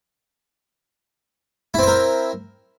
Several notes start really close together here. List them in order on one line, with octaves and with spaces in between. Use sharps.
E4 C4 C5 A#4